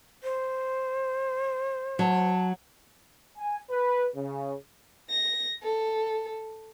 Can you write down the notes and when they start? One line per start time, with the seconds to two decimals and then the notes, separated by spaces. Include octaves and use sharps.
0.23 C5
1.99 F#3 A5
3.38 G#5
3.71 B4
4.16 C#3
5.10 A#6
5.62 A4